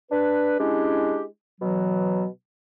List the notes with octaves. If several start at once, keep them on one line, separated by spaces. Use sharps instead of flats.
D4 B4
G#3 C#4 D4 E4 G4
B2 E3 F#3